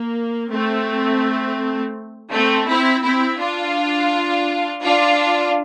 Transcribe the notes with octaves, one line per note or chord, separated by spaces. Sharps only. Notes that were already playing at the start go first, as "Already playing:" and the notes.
Already playing: A#3
A3 C4
A3 C4
C4 E4
C4 E4
D4 F4
D4 F4